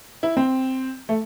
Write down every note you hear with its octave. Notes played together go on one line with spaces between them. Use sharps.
E4
C4
A3